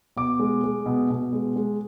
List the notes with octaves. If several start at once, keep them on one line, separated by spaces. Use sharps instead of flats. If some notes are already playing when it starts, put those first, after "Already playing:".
B2 D6
G#3
G#3
B2
B2
G#3
G#3